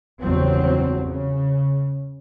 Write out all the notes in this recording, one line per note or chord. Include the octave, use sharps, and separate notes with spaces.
G1 E2 C#3 F#3 C4
C#3